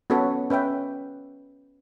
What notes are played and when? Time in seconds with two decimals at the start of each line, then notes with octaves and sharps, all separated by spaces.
0.10 B3 C#4 F#4 A4 B4 C#5
0.50 C#4 B4 E5 G5